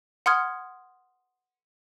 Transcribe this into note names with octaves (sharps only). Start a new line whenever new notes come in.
F#5 C6 D#6 F6 G#6